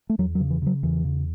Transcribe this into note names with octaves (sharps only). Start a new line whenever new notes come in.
A3
E2 F#3
F#3
C#3
E3
C#3 F#3
E2 E3
C#3